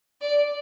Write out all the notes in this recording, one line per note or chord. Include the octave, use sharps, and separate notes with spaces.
D5